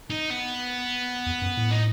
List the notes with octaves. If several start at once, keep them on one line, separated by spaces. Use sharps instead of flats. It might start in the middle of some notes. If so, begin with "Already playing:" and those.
D#4
B3
E2
F#2
A2
D#4